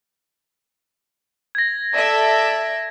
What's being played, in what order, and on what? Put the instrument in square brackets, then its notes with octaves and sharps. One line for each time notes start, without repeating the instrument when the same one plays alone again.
[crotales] G#6 A#6
[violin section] A4 D5 E5